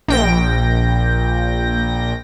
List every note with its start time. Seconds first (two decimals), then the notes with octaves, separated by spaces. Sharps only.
0.08 A#1 G5 A#6